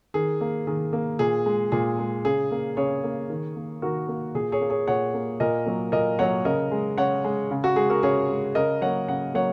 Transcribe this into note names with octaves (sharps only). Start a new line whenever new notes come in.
D#3 G#4
A#3
D#3 G#4
A#3
A#2 G#4
G#3
A#2 G#4
G#3
C#3 G#4
A#3
C#3 G#4 C#5
A#3
D#3
A#3
D#3 F#4 A#4
A#3
A#2 G#4
G#4 C#5
A#3
G#4 C#5
A#2 C#5 F#5
A#3
A#2 A#4 D#5
F#3 A#3
A#2 A#4 D#5
F#3 A#3 C#5 F#5
C#3 A#4 D#5
G#3
C#3 C#5 F#5
G#3
C#3
F#4
G#3 G#4
F#4 A#4
C#3 G#4 C#5
G#3
C#3 A#4 D#5
F#3 A#3 C#5 F#5
C#3 F#5
F#3 A#3 C#5 F#5